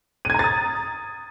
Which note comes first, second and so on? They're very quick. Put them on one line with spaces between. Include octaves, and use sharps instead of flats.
D#7 G#6 A#5 A6 D#6